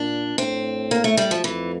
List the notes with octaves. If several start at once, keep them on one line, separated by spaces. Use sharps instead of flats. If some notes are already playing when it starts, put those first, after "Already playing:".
Already playing: A#2 D4
A2 C4
A#3
A3
G3
F3
F2 E3